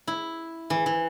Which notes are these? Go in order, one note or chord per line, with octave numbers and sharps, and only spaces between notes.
E4
E3
E3